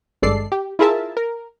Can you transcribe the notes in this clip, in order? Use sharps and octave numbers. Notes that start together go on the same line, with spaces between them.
G#1 G2 G#3 A4 D5 C7
G4
E4 F4 G#4 A#4 E5 A5
A#4